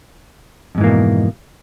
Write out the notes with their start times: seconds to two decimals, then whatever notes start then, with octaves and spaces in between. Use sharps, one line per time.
0.75 F2
0.78 G#2
0.81 E3
0.84 A#3
0.87 B2